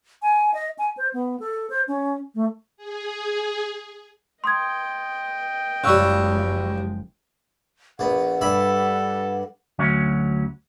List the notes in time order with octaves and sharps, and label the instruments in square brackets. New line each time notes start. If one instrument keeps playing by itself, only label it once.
[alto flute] G#5
D#5
G#5
C5
B3
A4
C5
C#4
A3
[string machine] G#4
[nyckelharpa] D#5 G5 [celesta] C6 D#6 G#6
[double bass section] F#1 F3 G#3 [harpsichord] C#3 G3 [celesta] C#6 E6 F#6
[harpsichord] A#1 B3 [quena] F#5
[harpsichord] G2 E5 B5 [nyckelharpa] A4
[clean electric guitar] D2 F#3 C#4